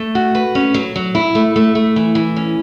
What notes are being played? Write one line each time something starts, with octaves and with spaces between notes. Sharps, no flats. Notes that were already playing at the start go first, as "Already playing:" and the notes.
Already playing: A3
F#4
B4
C#4
F#3
F#3
E4
A3
A3
A3
E3
E3
C#4